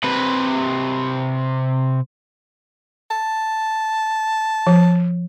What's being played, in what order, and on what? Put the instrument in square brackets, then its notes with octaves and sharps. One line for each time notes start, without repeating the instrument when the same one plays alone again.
[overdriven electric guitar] C3 B4
[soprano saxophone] A5
[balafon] F3